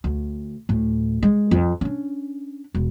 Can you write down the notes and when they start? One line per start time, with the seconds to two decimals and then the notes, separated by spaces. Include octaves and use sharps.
0.04 D2
0.69 D2 A2
1.23 G#3
1.51 F2
1.81 C#4 D4
2.74 E1